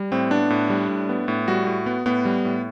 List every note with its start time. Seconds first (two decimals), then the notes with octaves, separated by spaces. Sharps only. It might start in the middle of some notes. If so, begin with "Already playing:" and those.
Already playing: G3
0.12 A2 C4
0.31 B3 D4
0.50 A2
0.70 G3
0.89 A2
1.09 B3
1.28 A2
1.48 G3 F#4
1.67 A2
1.86 B3
2.06 A2 B3
2.25 G3
2.45 A2